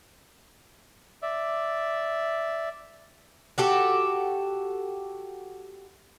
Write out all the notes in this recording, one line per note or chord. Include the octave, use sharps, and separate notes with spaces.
D5 E5
F#4 G4 A4